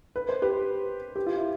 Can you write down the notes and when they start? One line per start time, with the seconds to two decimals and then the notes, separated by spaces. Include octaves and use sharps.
0.16 B4
0.29 C5
0.42 G4 B4
1.16 G4
1.27 F4
1.36 E4